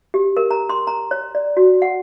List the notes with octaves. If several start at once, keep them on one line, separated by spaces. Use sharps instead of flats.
G4
A#4
A#5
C6
A#5
C#5
D5
F#4
F#5